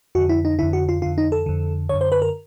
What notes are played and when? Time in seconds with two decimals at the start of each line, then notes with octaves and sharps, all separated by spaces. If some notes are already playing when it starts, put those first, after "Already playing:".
0.15 F2 D3 F#4
0.29 E4
0.45 D#4
0.59 F2 D3 E4
0.73 F#4
0.89 F4
1.02 F2 D3 F4
1.18 D#4
1.32 A4
1.46 F2 D3
1.89 F#2 D3 C#5
2.01 C5
2.12 B4
2.22 A#4